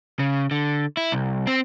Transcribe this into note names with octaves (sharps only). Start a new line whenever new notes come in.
C#3
D3
E4
C2
C4